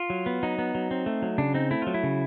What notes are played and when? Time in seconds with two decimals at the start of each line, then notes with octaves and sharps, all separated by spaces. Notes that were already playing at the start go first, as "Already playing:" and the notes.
Already playing: F4
0.10 F#3
0.26 B3
0.43 F#3 D#4
0.59 B3
0.75 F#3
0.91 C4
1.06 A3
1.22 F#3
1.38 C#3 D4
1.54 C4 D#4
1.71 A3 E4
1.82 F#3 F4
1.94 E4
2.03 C#3